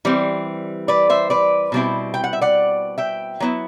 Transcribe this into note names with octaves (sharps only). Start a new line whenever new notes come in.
E3 G3 C4
B4 D5
C5 E5
B4 D5
B2 G3 C4 E4
G5
F#5
E5
D5 F#5
E5 G5
F#3 B3 E4